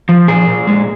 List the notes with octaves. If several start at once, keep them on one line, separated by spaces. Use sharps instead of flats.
F3
A#2 G#4
A#2
G#3